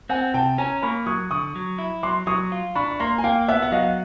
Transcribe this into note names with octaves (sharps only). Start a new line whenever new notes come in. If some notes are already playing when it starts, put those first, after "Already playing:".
C4 F#5 G#5
C3 G5 A5
C#4 G#5 A#5
A#3 B5 C#6
F#3 C#6 D#6
D3 C#6 D#6
F#3
E4
F#3 C6 D6
F#3 C#6 D#6
F4
D4 B5 C#6
C#6
A#3 A#5 C6
G#5
A#3 F5 G5
B3 E5 F#5
F#5
F#3 D#5 F5